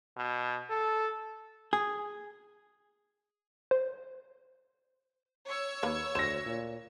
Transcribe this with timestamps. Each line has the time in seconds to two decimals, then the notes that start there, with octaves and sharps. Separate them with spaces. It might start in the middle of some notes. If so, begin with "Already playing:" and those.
0.17 B2
0.70 A4
1.73 G#4
3.71 C5
5.46 C#5 E6 G#6
5.83 D#2 A#3 B4
6.15 D2 C5 A#6 E7
6.46 A#2